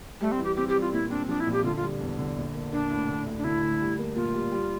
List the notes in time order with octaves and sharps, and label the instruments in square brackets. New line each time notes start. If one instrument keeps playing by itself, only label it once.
[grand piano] G3 [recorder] A3
[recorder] C4
[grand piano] E3
[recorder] G4
[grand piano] C4 [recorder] G4
[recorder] G4
[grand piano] G3
[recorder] F4
[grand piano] A#2 [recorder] E4
[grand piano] C4 [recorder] D4
[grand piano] F3 [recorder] D4
[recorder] E4
[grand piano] A#1
[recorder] G4
[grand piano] D3 [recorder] F4
[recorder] F4
[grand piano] G3
E2
D3
A#1
A#3
[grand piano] A#3 [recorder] D4
[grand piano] A2
D3
D2
[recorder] D4
[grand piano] D3 [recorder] E4
[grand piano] D2
G3
A#3
[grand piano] A#2 [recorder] F4
[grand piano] G3
G3